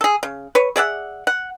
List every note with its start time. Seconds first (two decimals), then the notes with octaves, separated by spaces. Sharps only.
0.01 G#4 A4
0.23 C#3
0.55 B4 C#5
0.76 G#4 D5 E5 F#5
1.27 F#5